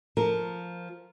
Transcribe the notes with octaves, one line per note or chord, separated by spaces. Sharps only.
F3 A#4